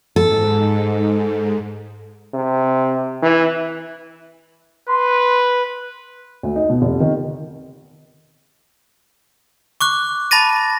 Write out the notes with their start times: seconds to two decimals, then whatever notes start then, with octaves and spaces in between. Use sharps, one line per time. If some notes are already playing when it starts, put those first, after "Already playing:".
0.16 G#2 A4
2.34 C3
3.22 E3
4.89 B4 C6
6.43 D2
6.56 D#4
6.70 B2
6.82 F1
7.00 D#3
9.81 C#6 D6 F#6
10.31 A5 B5 A6 A#6 D#7